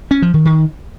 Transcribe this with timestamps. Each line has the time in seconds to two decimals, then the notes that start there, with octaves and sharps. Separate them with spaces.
0.11 C#4
0.22 F3
0.34 D#3
0.45 D#3